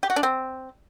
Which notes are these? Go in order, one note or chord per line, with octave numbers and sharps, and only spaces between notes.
G4
F#4
D4
C4